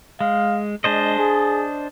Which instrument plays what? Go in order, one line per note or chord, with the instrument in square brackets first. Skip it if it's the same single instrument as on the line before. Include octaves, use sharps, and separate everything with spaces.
[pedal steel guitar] G#3 [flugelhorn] F5
[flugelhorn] G#3 [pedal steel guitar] D4 C5 D#5
[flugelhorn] G#4